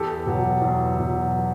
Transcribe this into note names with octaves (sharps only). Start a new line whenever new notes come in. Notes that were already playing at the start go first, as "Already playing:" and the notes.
Already playing: E2 G4 A4
B2 F#3
E2
B2 F#3